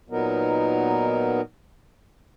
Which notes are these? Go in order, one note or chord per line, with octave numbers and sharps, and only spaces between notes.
A#2 F#3 B3 D#4 A#4